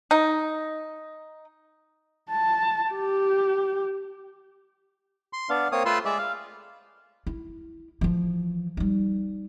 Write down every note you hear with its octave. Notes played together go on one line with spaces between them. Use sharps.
D#4
A5
G4
C6
B3 D4 F5
A#3 C4 C#5 D#6
A3 F4 A4 B4 C6 E6
G#3 D5 E5
F5
E4
E3 F3
G3 D#4